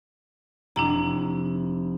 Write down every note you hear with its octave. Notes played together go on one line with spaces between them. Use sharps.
F1 D4 E4 A#5